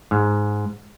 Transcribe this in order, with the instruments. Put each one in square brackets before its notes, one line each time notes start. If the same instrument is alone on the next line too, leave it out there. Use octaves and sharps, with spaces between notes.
[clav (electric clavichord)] G#2